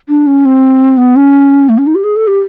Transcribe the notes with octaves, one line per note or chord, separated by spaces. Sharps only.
D4
C#4
C4
B3
C#4
A3
C#4
D#4
G4
G#4
A4
G4